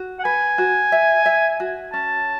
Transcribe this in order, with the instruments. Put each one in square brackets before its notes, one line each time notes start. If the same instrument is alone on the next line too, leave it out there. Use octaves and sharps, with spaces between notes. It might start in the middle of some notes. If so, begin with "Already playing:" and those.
Already playing: [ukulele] F#4
[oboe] F#5
[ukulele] B4 [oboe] G#5
[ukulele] F#4
E5
E5
F#4
[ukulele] C#4 [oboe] A5